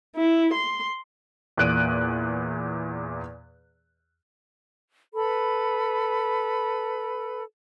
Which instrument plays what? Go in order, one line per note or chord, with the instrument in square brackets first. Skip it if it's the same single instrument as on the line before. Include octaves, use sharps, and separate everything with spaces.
[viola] E4
C6
[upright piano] E2 A#2 F#6 D7 D#7
[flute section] A4 B4 B5